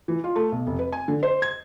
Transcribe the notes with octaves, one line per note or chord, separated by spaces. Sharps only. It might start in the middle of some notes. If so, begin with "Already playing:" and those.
E3
F4
A3
B1
F1
B4
G#5
D3
C5
G#6